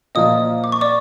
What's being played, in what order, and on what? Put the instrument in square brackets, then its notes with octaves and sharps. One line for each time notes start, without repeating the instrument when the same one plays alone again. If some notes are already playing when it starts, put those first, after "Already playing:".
[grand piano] A#2 F3 A#3 [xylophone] D#5 D#6
[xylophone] D6
C#6
D5 D6